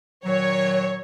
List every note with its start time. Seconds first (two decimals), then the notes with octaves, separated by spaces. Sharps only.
0.25 A#2 D#3 F#3 C#5